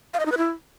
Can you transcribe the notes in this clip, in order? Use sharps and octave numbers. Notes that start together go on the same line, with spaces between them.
F5
D#5
D#4
B4
E4